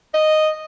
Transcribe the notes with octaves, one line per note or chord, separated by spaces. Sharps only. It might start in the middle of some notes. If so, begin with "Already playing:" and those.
D#5